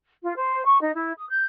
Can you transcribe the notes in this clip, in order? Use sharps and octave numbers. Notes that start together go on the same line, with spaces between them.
F4
C5
C#6
D#4
E4
D#6
G6